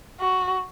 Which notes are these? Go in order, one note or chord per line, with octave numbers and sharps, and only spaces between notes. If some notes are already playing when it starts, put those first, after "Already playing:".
F#4